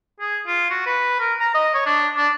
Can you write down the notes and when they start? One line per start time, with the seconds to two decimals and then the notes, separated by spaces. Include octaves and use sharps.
0.20 G#4
0.47 F4
0.71 F#4
0.86 B4
1.19 A#4
1.40 A#5
1.54 D#5
1.75 C#5
1.86 D4
2.17 D4